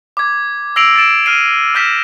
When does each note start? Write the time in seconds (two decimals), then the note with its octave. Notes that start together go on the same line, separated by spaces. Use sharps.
0.17 D6 G#6
0.76 E6 A#6 C7 D7 F7 F#7
0.96 A6 D7 E7
1.26 F6 C7 D#7
1.75 E6 F6 G6 A#6 B6 E7